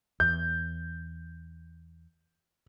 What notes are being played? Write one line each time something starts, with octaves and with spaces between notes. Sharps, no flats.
E2 G6